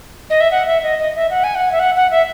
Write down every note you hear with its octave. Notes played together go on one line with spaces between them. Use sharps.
D#5
E5
F#5
E5
D#5
D#5
E5
F#5
G#5
F#5
E5
F#5
F#5
E5